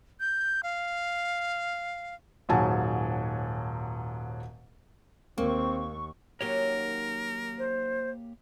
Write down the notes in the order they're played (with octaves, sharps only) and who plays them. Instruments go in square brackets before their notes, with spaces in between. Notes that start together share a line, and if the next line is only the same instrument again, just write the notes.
[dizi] G6
F5
[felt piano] D#1 G#2 F#3 G#5 A5
[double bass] D#2 [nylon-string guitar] A#3 [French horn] C4 [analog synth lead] C#6
[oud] D#3 F#3 C#4 [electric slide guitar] A#3 G4 C#5 [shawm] A#4
[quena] C5